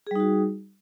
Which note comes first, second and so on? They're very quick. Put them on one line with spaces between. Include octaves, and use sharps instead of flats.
G#4 G3 D#4 F#4